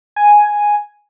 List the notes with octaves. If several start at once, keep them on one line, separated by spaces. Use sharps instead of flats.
G#5